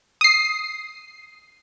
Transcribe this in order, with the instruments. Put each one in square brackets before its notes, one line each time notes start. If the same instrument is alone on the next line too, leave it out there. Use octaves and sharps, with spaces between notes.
[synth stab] D#6 C7